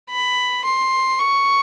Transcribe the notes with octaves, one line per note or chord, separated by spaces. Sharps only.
B5
C6
C#6